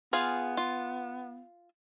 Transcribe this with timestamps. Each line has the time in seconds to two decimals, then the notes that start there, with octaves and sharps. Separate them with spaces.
0.13 B3 F4 G#4 F5
0.57 F4